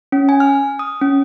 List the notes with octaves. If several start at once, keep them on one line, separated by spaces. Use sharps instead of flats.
C#4
G#5
F6
D#6
C#4